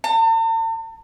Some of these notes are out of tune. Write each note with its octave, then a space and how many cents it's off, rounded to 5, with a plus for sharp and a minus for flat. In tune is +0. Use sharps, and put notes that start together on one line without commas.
A5 +45